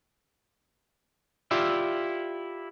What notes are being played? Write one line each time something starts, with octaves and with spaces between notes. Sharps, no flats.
E4 F4 G4 D5 E5